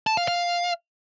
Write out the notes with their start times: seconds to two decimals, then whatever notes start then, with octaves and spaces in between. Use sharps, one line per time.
0.07 A5
0.17 F5
0.28 F5